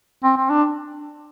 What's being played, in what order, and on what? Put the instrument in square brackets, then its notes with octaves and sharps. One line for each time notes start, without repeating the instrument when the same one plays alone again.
[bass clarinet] C4
C4
D4